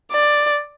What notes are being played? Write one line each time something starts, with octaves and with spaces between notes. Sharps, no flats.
D5